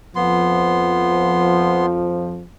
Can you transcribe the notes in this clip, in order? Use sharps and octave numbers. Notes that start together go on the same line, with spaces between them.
F2 F3 B3 C6